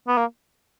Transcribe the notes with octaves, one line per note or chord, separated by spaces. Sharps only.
B3
A#3